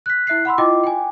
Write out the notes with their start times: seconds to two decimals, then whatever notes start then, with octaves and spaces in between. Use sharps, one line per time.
0.06 F#6 B6
0.27 E4 E5 F#6 C7
0.45 F#5 B5 C6 E6
0.58 E4 F4 D#5 G5 D6
0.84 G5 G#5